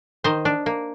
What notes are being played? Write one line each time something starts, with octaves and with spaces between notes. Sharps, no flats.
D#3 C5 D#5
D4
A#3